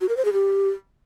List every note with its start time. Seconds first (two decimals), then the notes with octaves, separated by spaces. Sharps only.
0.01 F#4
0.09 A#4
0.17 C5
0.25 G#4
0.33 G4